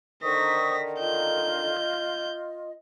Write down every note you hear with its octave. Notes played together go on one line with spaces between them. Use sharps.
D3 D#3 C5 C#6 D#6 A#6 B6
F4 D#5 G6